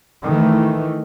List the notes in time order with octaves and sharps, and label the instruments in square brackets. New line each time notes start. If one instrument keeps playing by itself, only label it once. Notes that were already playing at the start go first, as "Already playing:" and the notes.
[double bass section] D#3 E3 A3